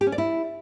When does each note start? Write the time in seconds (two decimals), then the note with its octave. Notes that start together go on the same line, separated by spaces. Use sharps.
0.01 G4
0.07 C#4
0.12 D5
0.18 E4